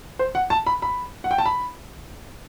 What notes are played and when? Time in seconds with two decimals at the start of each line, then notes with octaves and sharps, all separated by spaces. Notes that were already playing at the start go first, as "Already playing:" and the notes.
0.19 C5
0.35 F#5
0.50 A5
0.67 B5
0.82 B5
1.24 F#5
1.31 G5
1.38 A5
1.46 B5